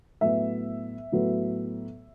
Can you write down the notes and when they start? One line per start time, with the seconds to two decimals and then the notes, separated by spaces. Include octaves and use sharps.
0.21 A2 F#3 B3 E5
1.12 A2 F#3 B3